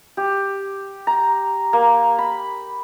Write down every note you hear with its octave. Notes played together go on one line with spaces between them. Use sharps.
G4
A#5
A#3
B5